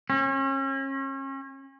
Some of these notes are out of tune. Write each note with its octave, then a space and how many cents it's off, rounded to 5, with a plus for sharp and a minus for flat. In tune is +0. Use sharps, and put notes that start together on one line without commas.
C#4 -35